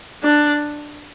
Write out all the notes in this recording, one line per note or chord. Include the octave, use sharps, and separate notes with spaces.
D4